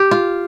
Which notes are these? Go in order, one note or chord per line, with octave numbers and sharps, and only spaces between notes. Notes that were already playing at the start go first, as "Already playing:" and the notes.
Already playing: G4
F4